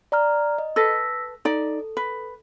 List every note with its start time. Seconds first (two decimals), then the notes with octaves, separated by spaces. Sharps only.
0.12 D5 A#5 F6
0.58 D#5
0.76 A4 B4 E6 A#6 B6
1.45 D#4 A4 D5
1.97 B4